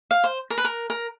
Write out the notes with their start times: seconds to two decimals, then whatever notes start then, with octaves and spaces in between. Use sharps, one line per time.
0.11 F5
0.24 C5
0.50 A#4
0.58 B4
0.65 A#4
0.90 A#4